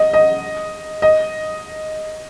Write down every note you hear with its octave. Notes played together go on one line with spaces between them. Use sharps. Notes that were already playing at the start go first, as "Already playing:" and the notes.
Already playing: D#5
D#5
D#5